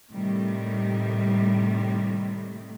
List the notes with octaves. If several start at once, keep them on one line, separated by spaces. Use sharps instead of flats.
A2 C3 D#3 G3 A3